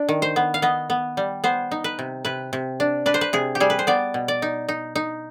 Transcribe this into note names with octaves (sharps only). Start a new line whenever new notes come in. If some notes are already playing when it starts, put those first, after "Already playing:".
Already playing: D4
D#3
C5
B3
F5
B3 D#5
B3
G3
B3 C5
D#4
B4
C3
C3 B4
C3
D4
D4 B4
C5
B4
C3 G#4
G4
G3 G#4
B4
C5
B3 D5
B2
D5
D#4
D#4
D#4